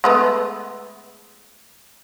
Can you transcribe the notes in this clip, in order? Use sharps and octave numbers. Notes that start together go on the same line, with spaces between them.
G#3 A3 B3